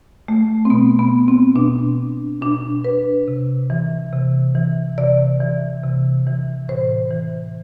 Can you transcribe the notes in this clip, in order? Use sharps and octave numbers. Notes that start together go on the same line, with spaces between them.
A3
C4
B2 B3
B3
C4
B2 D4
B2 D4
B4
C3
E3
C3
E3
C3 D5
E3
C3
E3
A2 C5
E3